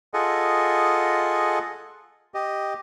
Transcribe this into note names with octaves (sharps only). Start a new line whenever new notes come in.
F4 G#4 A4 D#5 F#5
G4 D#5